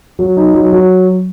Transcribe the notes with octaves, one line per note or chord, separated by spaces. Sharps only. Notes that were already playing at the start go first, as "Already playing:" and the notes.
F#3
D#4
F#3
F#3